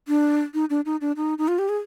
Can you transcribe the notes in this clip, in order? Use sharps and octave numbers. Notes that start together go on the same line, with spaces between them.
D4
D#4
D4
D#4
D4
D#4
D#4
F4
G4
G#4